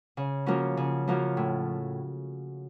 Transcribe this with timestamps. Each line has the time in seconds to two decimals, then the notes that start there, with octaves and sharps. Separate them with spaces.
0.17 C#3
0.46 F3 A#3 C#4 F#4
0.77 C#3
1.07 F3 A#3 C#4 F#4
1.37 A2